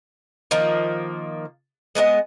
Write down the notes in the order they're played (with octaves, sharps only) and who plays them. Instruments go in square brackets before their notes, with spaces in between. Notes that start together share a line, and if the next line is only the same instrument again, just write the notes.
[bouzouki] D#3 F3 A#3
G#3 B3 D4 D#5